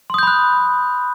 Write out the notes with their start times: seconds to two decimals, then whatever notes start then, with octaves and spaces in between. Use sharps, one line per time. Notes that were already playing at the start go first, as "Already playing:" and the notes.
0.10 C6
0.14 D#6
0.18 G6
0.23 B5
0.27 F#6